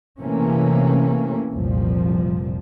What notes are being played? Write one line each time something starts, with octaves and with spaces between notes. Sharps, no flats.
C3 E3 A3 A#3 C#4
F1 C2 A#2 F3